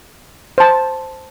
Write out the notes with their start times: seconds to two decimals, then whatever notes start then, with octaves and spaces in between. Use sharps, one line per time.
0.58 C5 A5